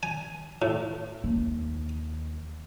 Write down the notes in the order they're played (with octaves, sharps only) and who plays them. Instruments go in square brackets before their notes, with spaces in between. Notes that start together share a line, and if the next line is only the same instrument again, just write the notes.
[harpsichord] G#5
A2
[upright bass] D#2